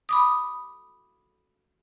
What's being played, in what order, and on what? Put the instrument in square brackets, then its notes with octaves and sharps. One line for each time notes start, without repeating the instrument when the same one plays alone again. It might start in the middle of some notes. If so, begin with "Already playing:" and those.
[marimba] B5 D6 D#6